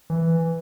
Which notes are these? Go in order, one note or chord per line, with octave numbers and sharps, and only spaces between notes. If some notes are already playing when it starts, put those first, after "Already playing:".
E3